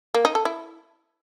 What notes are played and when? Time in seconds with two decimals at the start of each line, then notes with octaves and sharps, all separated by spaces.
0.14 A#3
0.25 D#4
0.35 A4
0.45 E4